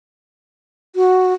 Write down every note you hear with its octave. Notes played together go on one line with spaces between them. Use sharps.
F#4